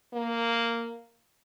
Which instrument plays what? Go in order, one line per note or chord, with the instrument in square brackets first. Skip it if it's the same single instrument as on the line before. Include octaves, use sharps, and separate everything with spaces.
[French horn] A#3